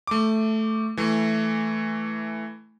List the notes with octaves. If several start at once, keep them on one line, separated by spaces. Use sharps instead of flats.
A3 D6
E3 A3